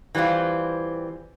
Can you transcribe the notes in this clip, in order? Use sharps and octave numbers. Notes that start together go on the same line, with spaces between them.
E3 G3 B3 C4 F4